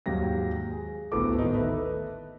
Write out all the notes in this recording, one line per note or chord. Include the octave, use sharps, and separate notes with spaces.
D#2 G#2 F#3 G4 A#6
G#4
G#1 D2 A2 B3 A4 D6
D#3 B3 D#4
A4 B4 E5